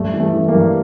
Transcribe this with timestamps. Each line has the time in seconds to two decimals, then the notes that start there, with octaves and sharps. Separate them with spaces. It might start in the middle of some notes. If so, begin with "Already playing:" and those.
Already playing: G2 A3
0.13 E3
0.20 A3
0.33 E3
0.48 A#3
0.55 G2